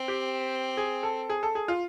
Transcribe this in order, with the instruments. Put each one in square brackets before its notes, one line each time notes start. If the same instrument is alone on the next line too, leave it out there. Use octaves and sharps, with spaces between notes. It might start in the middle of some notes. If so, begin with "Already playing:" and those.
Already playing: [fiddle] C4
[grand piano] G4
G#4
A4
G#4
A4
G#4
F4